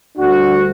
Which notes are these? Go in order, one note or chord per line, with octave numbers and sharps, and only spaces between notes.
D2 D3 G3 D4 F#4